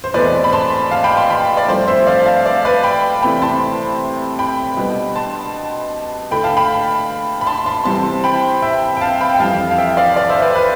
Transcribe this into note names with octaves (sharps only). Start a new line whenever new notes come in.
C5
E2 B2 A3 C4 B4 D5
B5
A5 C6
F5 A5
G5 B5
A5 C6
G5 B5
D5
G2 F3 A3 C4 C5
C5 E5
D5 F5
F5 A5
D5 F5
B4 D5
G5 B5
C3 E3 A3 C4 G5 B5
A5 C6
G5 B5
B2 G3 B3 D4
A5 C6
D3 A3 D4 G5 B5
F5 A5
G5 B5
B5
A5 C6
A5 C6
C3 E3 G3 C4 A5 C6
G5 B5
E5 G5
G5
F5 A5
G5 B5
G5
F2 E3 G3 F5 A5
F5
E5 G5
D5 F5
D5 F5
C5 E5
B4 D5
B4